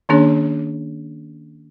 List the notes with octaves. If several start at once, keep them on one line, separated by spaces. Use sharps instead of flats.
D#3 A#3 C#4 D4 G#4 C#5